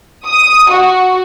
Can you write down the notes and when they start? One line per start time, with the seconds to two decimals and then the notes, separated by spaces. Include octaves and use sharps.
0.25 D#6
0.70 F#4